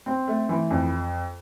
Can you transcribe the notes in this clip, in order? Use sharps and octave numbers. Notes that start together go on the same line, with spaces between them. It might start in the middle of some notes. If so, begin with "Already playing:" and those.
C4
A3
E3
F2